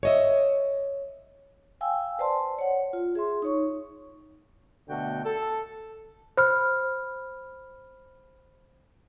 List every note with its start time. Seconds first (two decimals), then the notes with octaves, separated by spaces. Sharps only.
0.03 C#5 D#5 E5
1.81 F5 G5 G#5 E6
2.19 B4 C5 D5 A5 C6
2.59 C#5 F#5
2.93 F4
3.15 G#4 E5 C6
3.42 D#4 C#5 C#6
4.89 B2 D3 A3 F#4 G5
5.25 A4
6.37 C5 B5 F6